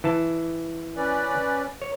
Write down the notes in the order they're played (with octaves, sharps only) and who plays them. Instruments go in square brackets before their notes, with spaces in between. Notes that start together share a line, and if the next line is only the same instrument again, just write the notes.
[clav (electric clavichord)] E3 A5
[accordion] C#4 B4 D5
[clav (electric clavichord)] C#5